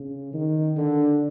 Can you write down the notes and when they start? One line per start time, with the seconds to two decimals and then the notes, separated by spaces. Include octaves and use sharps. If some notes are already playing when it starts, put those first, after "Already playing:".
Already playing: C#3
0.33 D#3
0.77 D3